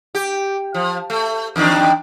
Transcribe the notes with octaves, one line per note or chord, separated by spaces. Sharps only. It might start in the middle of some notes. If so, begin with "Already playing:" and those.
G4
F3
A3
E2 D#3 D4